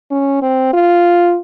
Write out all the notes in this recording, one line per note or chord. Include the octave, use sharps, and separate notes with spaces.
C#4
C4
F4